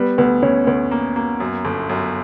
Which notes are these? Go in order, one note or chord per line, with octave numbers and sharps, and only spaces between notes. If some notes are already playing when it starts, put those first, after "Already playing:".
Already playing: G3 B3 B4
D2 B3 B4
D2 C#4 C#5
D2 B3 B4
A#3
A#3
F#2
G1
F#2